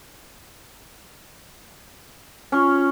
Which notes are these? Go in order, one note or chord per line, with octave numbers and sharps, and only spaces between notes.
C#4 F4 C#6